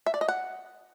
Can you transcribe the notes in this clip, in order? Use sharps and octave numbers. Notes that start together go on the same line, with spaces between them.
E5
D5
D#5
F#5